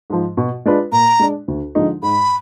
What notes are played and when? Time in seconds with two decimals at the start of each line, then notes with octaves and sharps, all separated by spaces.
0.10 G#2 F3
0.37 B2
0.65 G#3 D4 F4 B4
0.92 A#2 A#5
1.19 G#3 D4
1.48 D2
1.75 D3 F3 G#3 D#4
2.02 G#2 B5